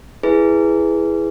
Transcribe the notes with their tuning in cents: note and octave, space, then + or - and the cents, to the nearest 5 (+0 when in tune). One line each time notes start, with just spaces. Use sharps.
E4 +0 G#4 +0 B4 +0